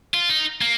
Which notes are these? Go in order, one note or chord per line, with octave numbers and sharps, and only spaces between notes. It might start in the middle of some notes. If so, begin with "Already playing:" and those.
F4
D#4
A#3